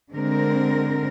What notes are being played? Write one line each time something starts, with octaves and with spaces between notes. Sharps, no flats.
D3 G#3 C4 A#4